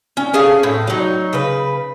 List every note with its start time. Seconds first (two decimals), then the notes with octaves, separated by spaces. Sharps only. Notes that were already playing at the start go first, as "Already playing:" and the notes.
0.17 C#4
0.34 C#4 G#4 A4 F5
0.63 A2
0.87 F#3 D#4
1.33 C#3 B4